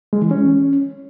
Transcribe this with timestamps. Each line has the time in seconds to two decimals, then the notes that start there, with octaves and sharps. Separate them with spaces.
0.13 G#3
0.22 E3
0.31 C#4